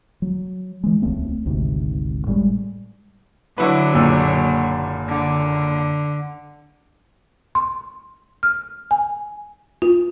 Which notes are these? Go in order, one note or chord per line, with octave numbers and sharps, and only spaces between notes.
F#3
E3 G#3
D#1 C#2 A3 C4
G#1 D2 G#2 C3
A2 G3 G#3
D3 F#3 E4 B4
F#1 A#2 E6
D3
C6
F6
G#5
F4